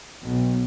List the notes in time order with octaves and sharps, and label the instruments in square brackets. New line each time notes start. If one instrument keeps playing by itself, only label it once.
[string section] B1